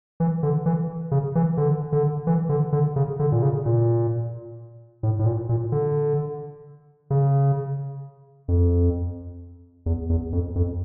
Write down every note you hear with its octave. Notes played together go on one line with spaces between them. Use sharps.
E3
D3
E3
C#3
E3
D3
D3
E3
D3
D3
C#3
D3
A#2
C#3
A#2
A2
A2
A#2
A#2
D3
C#3
F2
E2
E2
F2
F2